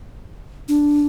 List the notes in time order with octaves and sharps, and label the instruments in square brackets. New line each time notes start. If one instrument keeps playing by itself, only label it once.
[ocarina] D4